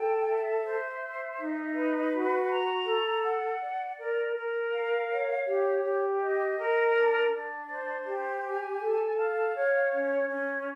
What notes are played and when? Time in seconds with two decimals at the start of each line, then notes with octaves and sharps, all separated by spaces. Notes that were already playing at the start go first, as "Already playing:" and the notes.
Already playing: A4 G5
0.27 E5
0.64 C5
1.01 E5
1.38 D#4
1.75 B4
2.12 F#4
2.49 A#5
2.86 A4
3.24 F#5
3.61 D5
3.98 A#4
4.36 A#4
4.72 F5
5.09 C#5
5.46 G4
5.84 G4
6.20 D#5
6.57 A#4
6.95 D4
7.32 D4
7.68 C5
8.07 G4
8.43 G#5
8.80 A4
9.17 F5
9.54 C#5
9.92 C#4
10.29 C#4